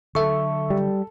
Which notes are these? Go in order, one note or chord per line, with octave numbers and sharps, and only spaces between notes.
D3 F#3 A4 E5 C#6
G3